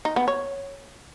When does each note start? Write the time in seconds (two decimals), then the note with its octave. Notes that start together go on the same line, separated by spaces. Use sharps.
0.05 D#4
0.16 B3
0.28 C#5